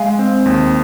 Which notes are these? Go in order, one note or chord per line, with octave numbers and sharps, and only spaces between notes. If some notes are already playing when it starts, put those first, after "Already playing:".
Already playing: G#3 F5 G#5
C4
D#2